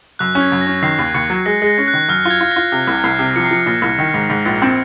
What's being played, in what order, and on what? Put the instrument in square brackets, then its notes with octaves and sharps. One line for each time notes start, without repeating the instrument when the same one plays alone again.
[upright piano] F#2 [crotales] F#6
[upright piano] C#4
[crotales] G#6
[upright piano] F#2
[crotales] A#6
[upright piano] C#4
[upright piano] D#3 [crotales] C7
[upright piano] D#2
[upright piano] D#2 [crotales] C#7
[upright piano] F#3
[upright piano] G#3 [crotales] A#6
[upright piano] G#3
[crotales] A#6
[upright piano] C#4
[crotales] F#6
[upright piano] D#3
[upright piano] F#2 [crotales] F6
[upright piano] F4
[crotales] G#6
[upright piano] F4
[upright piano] F4 [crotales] A#6
[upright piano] C3
C2
[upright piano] C2 [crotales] C7
[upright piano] C3
[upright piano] F3 [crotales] C#7
[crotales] C7
[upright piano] F3 [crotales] C#7
[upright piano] A#2 [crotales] A#6
[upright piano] C2
D#3
G#2
G#2
A#1
C4